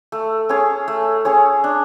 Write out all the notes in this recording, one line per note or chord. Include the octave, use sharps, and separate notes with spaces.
A3
C#4 G#4 C#5
A3
C#4 G#4 C#5
D4